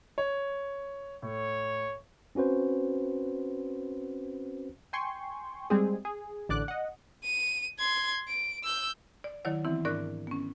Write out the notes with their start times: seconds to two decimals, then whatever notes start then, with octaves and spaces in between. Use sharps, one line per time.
0.18 C#5
1.22 A2 C#5
2.35 C4 C#4 F#4 B4 C5
4.93 G5 G#5 C6 C#6
5.70 G3 G#3 C4 G#4
6.05 G#4
6.49 A1 D3 D5 D6 F#6
6.68 D#5 F#5
7.24 D#7
7.79 C6 G#6
8.28 D7
8.63 E6 G6
9.24 D5
9.45 D#3 F#3 E4 C#5 D5 F#5
9.64 E3 B3 C4 E4
9.85 G#2 D4 A#4 D5 C#6 F#6
10.27 B3 C#4